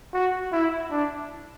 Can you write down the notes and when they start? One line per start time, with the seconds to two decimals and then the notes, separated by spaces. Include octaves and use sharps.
0.14 F#4
0.52 E4
0.91 D4